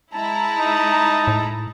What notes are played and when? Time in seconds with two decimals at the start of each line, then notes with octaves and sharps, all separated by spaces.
0.14 G#3 E4 A5 A#5
0.58 D#4
1.27 A2